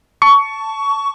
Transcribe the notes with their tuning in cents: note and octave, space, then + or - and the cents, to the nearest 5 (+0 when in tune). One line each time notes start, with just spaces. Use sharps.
A5 +0 C#6 +20